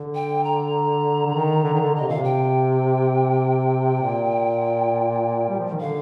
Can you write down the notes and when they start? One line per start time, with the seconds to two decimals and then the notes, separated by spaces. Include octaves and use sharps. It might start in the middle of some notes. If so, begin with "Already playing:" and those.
Already playing: D3
0.15 G5
0.44 A#5
1.26 D3
1.35 D#3
1.63 D3
1.73 D#3
1.82 D3
1.93 D3 D#5
2.01 C3
2.09 A#2 F5
2.16 C3
2.24 G5
4.02 A#2
5.49 G3
5.59 F3
5.70 D#3
5.80 D3 F5